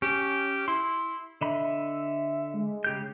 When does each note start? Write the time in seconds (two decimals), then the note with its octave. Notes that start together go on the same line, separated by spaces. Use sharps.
0.02 C#4 G4
0.68 E4 C6
1.41 D3 D#5 E5 B5
2.54 G#3
2.84 C#3 G4 G6